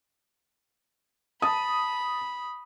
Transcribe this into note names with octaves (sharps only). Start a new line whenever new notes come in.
A5 B5 D#6